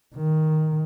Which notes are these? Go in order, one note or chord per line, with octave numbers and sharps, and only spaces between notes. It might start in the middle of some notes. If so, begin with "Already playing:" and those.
D#3